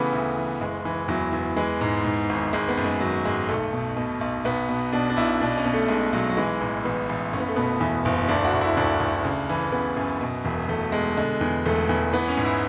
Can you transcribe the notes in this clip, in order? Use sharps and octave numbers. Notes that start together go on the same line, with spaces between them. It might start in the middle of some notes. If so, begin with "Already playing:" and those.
Already playing: C#3 E3 A3 B3
D2
E3
F#1 G#3
E3
E2 F#3
E2
E3 G#3
G#2
G#2
G#1
G#1 G#3
B3
F#2
G#3
G#1 F#3
G#1 G#3
B1 A3
B2
B2
B1
B1 B3
B2
B2 D4
D4
B1 E4
B2 D4
C#4
B2
A3
B1 G#3
B1 F#3
F#3
E3 G#3
A1
A1 B3
A1
F#1 C#4
B3
A3
B2 B3
E2
F#1
D2 D4
F#4
D2
E4
D2 D4
D2
C#3
E3
C#3 B3
F#2
B2
E1
E1 A3
B2 G#3
D3 G#3
E2
E1 A3
E2
E3 B3
C#4
G#2
E4